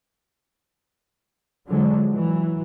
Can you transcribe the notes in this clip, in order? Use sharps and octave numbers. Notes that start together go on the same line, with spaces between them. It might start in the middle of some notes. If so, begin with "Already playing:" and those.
D3 F3 F#3 G#3
E3 F#3